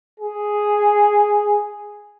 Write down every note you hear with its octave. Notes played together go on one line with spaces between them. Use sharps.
G#4